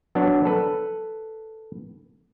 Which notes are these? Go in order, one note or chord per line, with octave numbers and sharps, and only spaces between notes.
F#3 B3 D4
A4 B4